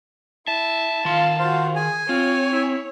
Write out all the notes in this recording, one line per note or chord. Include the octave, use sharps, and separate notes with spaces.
E4 E5 A5
D#3 F4 F5 C6
F4 F#4 C5 F5
G#4 G#5
C4 F4 C#5
E4